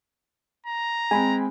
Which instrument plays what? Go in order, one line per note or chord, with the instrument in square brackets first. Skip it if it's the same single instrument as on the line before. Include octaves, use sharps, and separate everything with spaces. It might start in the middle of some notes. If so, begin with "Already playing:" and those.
[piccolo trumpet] A#5
[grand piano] G#3 C4 [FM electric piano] G#5 B5